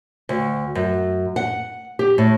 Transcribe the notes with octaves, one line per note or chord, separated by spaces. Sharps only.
D2
F#2
F#5
G4
A2